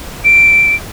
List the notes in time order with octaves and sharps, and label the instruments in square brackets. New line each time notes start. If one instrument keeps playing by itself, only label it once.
[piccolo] D7